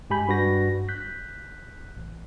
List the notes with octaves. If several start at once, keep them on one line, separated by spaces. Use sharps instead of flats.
G2 G#3 G4 G#5 B5 G6
G2 F#4 A#6
F#6 G6 B6
A1